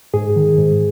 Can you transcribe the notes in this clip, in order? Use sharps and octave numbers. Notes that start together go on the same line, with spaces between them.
G#2 G#4
D#3
G#2